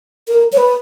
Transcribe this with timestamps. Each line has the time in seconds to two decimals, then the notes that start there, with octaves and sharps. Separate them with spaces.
0.28 A#4
0.52 C#5
0.58 B4